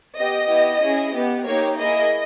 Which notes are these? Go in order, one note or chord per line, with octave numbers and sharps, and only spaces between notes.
B3 G4 D#5
B3 E4 G4
C#4 E4 G#4
B3 G4
A#3 D#4 G4 C#5
A#3 E4 G#4 D#5